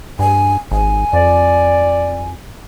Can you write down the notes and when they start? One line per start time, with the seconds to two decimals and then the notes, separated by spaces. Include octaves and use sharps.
0.19 G2 G#5
0.71 G#1 G#5
1.13 F2 D5